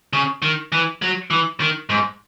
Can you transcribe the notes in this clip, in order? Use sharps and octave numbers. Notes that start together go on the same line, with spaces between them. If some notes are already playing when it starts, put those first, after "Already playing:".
C#3
D#3
E3
F#3
E3
D#3
G#2